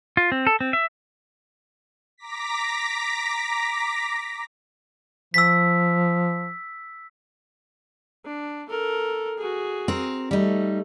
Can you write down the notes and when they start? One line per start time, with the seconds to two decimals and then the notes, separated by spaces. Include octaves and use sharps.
0.17 F4
0.32 C4
0.47 A4
0.61 C4
0.73 E5
2.18 A#5 D6 A#6 B6
5.34 F3 E6 B6
8.25 D4
8.70 A4 A#4
9.38 F#4 G#4
9.88 C4 A#4
10.31 G3 A3 D#4